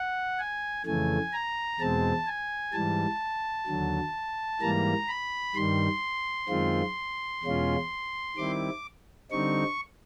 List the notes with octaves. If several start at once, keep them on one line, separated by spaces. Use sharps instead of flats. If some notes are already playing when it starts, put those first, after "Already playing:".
Already playing: F#5
G#5
F2 C#3 E3 A3 G#5
A#5
E2 B2 G#3 C4 A5
G#5
G#2 E3 G3 A5
D#2 D3 F#3
G#2 E3 G3 A#3 A#5
B5
G2 D#3 G3 C6
F#2 D#3 G#3 C4 F4
E2 B2 G#3 C#4 F4
D#3 G3 C4 E4 D6
D3 G3 C4 D#4 C#6